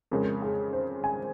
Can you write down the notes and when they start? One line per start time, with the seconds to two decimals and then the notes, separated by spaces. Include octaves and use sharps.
0.11 F2 C#3 G#3 A#4
0.42 G#4
0.73 C5
1.04 G#5